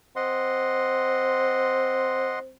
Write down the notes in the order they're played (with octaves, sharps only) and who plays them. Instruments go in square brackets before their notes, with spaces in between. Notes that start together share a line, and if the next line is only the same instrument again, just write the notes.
[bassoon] C4 [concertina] D#5 F#5 C6